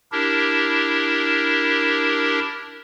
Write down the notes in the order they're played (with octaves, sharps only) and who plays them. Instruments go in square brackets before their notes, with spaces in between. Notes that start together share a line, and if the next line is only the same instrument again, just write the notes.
[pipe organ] D4 E4 G4 A#4